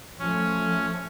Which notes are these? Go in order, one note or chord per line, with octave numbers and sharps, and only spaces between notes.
F3 A3 C#4